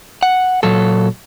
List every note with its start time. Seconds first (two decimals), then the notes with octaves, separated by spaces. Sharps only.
0.23 F#5
0.63 A#2 F#3 A4